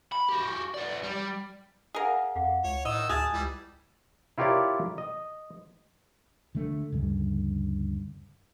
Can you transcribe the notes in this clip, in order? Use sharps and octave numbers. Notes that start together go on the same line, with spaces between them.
B5
F#4 G4
B3 D5
G3
G#4 A#4 D#5 F5 F#5
F2 F5 F#5 D6
C#2 C#5
A2 D#3 D#5 E6
D2 G#3 G#4 A5
C#2 E3 G3
E4 F4 G4 A#4 C#5 D5
D#5
D3 A3
D2 G2 C#3